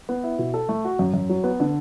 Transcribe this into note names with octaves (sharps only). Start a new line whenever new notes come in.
B3
E4
B2
A4
A3
F#4
F#2
F#2
F#3
B3
D3